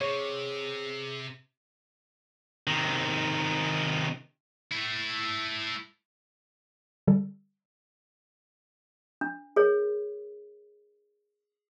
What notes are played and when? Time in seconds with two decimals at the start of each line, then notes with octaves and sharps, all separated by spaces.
0.01 C3 G#4 C#5
2.67 C3 D#3
4.72 A3 E4
7.07 D3 G3 A4
9.21 D4
9.56 G#4 A#4 C#5